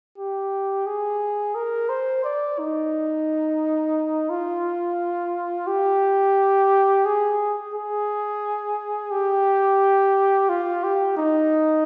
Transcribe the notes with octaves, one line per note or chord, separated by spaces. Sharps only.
G4
G#4
A#4
C5
D5
D#4
F4
G4
G#4
G#4
G4
F4
G4
D#4